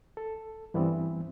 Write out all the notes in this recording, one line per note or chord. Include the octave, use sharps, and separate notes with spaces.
A4
G2 E3 G3 B3 C4